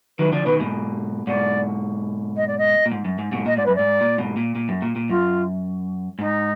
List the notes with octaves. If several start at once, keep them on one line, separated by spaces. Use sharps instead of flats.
D#3 F#3 B4
D3 F3 D5
B2 D#3 B4
G#2 B2
G#2 B2 D5
D#5
D5
D#5
A#2
G#2
F#2
G#2
G#2 B2
A#2 D#5
G#2 D5
F#2 B4
G#2 D5
A#2
G#2 B2
A#2
A#2
F#2
A#2
A#2
F#2 F4
G#2 D#4